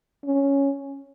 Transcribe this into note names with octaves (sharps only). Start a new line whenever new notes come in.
C#4